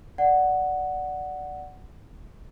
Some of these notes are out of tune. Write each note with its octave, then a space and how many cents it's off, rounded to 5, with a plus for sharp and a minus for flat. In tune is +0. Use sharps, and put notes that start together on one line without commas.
D5 +0 F#5 +0